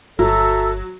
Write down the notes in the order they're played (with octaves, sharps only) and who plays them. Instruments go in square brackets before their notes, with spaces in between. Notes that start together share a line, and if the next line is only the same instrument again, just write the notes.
[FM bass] G1 [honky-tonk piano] F#3 [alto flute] A4 [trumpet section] C#5 E5 A#5